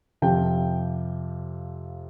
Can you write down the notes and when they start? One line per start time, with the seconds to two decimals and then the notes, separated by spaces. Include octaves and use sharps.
0.22 F2 C3 F3 G5